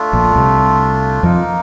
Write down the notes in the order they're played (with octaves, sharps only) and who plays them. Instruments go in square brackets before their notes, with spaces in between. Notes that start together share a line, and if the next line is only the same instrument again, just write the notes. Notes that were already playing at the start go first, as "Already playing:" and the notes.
Already playing: [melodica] A3 D4 F4
[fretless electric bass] A#1 A#2
C2 C3
[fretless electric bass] F2 F3 [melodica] A#3 D#4 A#4